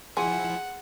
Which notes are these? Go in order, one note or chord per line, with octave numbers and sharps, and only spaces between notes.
F3 E4 G#4 F#5 G#5 C6